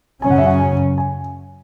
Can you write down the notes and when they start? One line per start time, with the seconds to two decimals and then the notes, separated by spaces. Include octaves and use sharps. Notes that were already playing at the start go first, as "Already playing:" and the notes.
0.22 F#2 C#3 F#3 C#4 G#5
0.30 F#5
0.38 E5
0.46 F#5
0.60 G#5
0.98 G#5